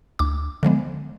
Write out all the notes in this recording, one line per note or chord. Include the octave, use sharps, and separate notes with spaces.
D2 D6
D3 F3 G#3 B3